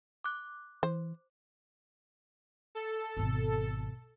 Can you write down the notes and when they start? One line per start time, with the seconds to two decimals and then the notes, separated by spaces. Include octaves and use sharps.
0.24 D6 F#6
0.83 E3 C5
2.75 A4
3.17 G#1 B2